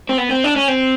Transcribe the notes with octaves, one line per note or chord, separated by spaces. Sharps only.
C4
B3
C4
D4
C#4
C4